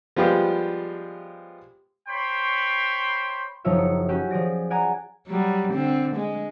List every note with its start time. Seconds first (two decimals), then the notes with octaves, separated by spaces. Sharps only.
0.16 F3 G3 G#3 B3 F4 G4
2.08 C5 C#5 G5 B5 C6
3.65 F#1 F3 D#4 F4 C#5 E5
3.79 C#7
4.09 C#4 F#4 G4
4.30 F3 G#4 D5 A#6
4.70 D5 F#5 G#5 A#5
5.28 F#3 G3
5.73 D3 C4
6.16 G#3